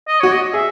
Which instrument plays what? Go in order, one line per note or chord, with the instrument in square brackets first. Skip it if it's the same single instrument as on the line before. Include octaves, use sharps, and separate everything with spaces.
[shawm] D#5
[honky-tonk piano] F#4 [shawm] C#5
[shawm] D#5
[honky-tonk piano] G#4 [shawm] E5